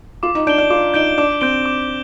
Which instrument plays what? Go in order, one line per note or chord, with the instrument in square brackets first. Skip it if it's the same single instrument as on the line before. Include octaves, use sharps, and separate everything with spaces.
[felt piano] F4 [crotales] D6
[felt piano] D#4
[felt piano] D4 [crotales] G6 D7 G7
[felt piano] D4
[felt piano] F4 [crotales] D6
[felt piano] D#4 [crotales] G6 D7 G7
[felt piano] D4 [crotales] D6
[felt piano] C4 [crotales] G6 D7 G7
[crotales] D6